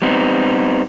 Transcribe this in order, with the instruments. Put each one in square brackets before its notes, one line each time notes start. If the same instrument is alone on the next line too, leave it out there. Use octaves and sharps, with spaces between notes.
[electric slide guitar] G3 B3 C4 D#4